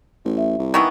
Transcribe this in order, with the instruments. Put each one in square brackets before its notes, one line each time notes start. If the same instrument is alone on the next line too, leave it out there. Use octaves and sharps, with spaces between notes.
[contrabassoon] A1
[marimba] E5
[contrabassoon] C2
[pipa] D#3 E3 B3 [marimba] C#6